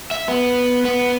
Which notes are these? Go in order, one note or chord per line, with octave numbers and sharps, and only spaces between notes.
E5
B3
B3